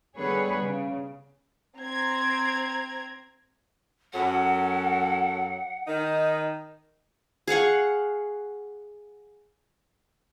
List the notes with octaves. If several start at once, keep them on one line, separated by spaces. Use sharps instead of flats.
D3 G3 B3 G#4 B4 C#5
C#3
C4 A#5 G#6
F#2 F#3 A4 F#5
D#3 D#4
G#4 F5 F#5 C#6